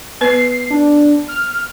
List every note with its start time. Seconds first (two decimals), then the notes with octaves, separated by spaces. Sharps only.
0.21 B3 B4 C7
0.71 D4
1.28 F6